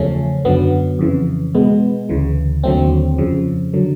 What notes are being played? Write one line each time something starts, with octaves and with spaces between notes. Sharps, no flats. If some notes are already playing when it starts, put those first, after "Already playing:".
Already playing: E2 C#3 F3 A3 C#4
F#2 D3 F#3 B3
F2 C#3 E3
B2 G#3 B3
D2 C#3 E3
D#2 D3 F#3 A3 C4
F2 C#3 F3
D3 F#3